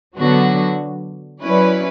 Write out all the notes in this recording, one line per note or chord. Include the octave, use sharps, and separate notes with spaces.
D3 F#3 B3 D4 F#4
F#3 C#4 E4 B4 D5